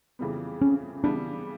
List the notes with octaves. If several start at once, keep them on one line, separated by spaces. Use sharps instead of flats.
F2 C#3 E3 G3 B3
C#4
C#3 E3 G3 B3 D4